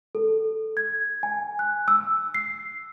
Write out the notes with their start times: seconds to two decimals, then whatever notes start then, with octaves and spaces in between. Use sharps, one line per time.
0.15 A4
0.77 G#6
1.23 G#5
1.59 F#6
1.88 E6
2.35 C7